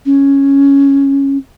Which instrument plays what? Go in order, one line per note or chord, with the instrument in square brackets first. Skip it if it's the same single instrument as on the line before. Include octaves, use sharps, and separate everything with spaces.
[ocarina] C#4